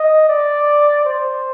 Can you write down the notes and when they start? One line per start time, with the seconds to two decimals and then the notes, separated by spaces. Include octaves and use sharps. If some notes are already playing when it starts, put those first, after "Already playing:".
Already playing: D#5
0.28 D5
1.05 C5